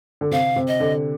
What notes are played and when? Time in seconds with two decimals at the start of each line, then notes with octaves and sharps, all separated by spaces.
0.21 D3
0.31 C3 F5
0.56 C3
0.68 D#5
0.80 D3